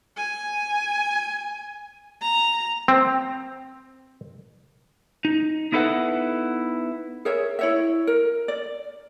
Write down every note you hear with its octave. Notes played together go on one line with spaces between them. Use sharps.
G#5
A#5
C4
D#4
B3 D#4 E4 A4 B4 F#5
G#4 A#4 C#5 E5
E4 C#5 E5
A#4
D5